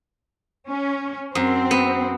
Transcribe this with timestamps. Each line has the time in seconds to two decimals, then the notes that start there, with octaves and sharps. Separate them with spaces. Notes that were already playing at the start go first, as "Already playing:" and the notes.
0.69 C#4
1.35 F#2 C4
1.71 B3